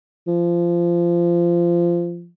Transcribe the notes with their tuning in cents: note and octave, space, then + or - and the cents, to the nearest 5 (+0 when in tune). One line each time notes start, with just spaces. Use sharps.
F3 -20